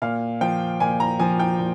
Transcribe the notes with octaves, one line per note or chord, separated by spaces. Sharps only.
A#2 F5
F3 G5
A#2 G#5
A#5
F3 G#5
G5
A#2